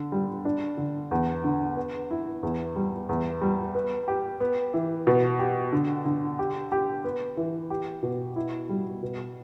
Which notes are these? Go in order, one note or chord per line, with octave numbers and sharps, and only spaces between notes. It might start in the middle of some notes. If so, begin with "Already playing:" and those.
Already playing: D3
G3
D4
D3
E2
D3
B3
E4
E2
G3
E2
G3
B3
G4
B3
E3
B2
G4
D3
D3
G4
G4
B3
E3
G4
B2
E4
G3
B2